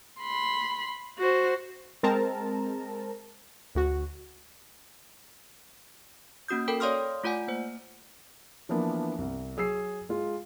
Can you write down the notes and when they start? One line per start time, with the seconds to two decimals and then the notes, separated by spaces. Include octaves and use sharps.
0.20 B5 C6
1.18 F#4 C5
2.03 G#3 C4 A#4 A5 A#5
3.75 D2 F#4
6.48 A#3 C#4 F#4 D#6 G6
6.68 A4 A#4 G5 B5
6.80 C#5 D5 F5 C6 D#6 F6
7.24 A3 F4 D5 F#5 G#5
7.48 A#3 C5
8.69 E3 F3 A#3 B3 D4
9.18 C2
9.57 F#3 G#4 E6 C7
10.09 G#3 F4